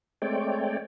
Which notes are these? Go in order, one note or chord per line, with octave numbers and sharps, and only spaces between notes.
G#3 A3 C4 C#5 D5 G5